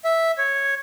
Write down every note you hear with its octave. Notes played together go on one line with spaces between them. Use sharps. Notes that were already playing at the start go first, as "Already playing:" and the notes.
E5
C#5